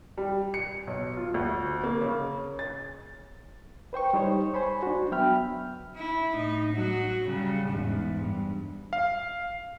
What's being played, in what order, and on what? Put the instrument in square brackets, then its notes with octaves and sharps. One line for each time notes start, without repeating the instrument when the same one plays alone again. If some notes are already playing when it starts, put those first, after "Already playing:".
[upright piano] G3
C#7
B1
F4
D2
A#3
C#3
A6
[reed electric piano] B4 C5 G5 C#6
G3 D#4 G4 C5 C#5
C5 G#5 B5 C#6
D4 F#4
F#3 B3 E5 G5 B5 F6
[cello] E4
A2 D#4
F#3 F#4
C#3 G3
E2 G#2
G2
[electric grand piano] F5